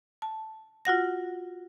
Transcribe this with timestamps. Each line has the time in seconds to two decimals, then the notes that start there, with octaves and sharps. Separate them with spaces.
0.22 A5
0.85 F4 F#4 F#5 A#6